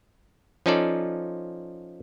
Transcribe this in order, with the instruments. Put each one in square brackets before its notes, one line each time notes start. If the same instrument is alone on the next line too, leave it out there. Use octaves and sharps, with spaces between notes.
[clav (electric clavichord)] F3 C#4 D#4 F4 A4 D5